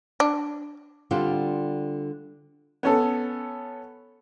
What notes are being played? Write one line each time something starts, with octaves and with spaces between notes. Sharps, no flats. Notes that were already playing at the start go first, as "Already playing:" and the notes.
D4
D3 G3 C4 F4
B3 C#4 A4